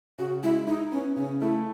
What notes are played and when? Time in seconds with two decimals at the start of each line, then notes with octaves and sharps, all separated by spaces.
0.18 C#3 F#4
0.43 G#3 E4
0.67 D#4 E4
0.92 B3 C#4
1.16 C#3 C#4
1.41 A3 E4